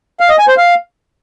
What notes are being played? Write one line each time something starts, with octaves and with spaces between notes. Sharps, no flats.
F5
D#5
G#5
C5
F5